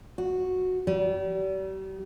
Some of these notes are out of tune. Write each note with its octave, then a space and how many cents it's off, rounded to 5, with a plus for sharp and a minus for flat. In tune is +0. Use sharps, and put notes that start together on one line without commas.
F#4 -5
G3 -40